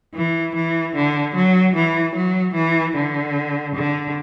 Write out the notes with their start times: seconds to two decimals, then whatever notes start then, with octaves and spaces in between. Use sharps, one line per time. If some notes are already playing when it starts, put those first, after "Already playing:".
0.15 E3
0.55 E3
0.96 D3
1.35 F#3
1.76 E3
2.15 F#3
2.55 E3
2.95 D3
3.75 D3